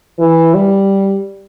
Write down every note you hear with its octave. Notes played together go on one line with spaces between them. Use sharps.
E3
G3